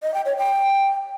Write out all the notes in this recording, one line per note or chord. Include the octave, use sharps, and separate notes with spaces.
D#5
G5
C#5
G5